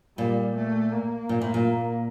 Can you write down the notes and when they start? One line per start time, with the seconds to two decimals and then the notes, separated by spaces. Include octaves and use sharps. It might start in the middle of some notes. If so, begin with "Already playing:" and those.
0.17 A#2 G3
0.55 A3
0.92 A#3
1.29 A#2
1.41 A2
1.54 A#2